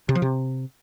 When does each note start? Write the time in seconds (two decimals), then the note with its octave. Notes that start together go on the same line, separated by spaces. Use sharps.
0.09 C3
0.15 F3
0.22 C3